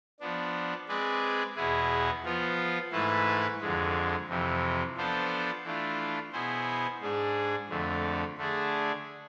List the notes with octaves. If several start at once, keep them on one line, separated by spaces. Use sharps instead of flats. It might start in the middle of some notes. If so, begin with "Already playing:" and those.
F3 B3 D4
G#3 C4 G#4 B4 D5
E2 B2 B3 E4 G#4
F3 B3 F4
G#2 E3 A3 E4 B4
F2 D3 G#3
F2 C3 E3
F3 B3 D4 A4 C5
E3 A3 D4 F4
B2 B3 E4 G#4 C5
G#2 G#3 D4 G#4
F2 D3 A3
D3 A3 D4 G#4